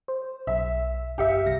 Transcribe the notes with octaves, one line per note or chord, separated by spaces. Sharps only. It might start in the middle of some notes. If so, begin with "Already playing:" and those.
C5
B1 E5
G1 G4 E5 F5 C#7
C2 A#6